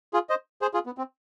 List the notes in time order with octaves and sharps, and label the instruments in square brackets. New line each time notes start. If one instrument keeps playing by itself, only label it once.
[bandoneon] F4 G#4
C5 D#5
G#4 C5
F4 G#4
B3
C4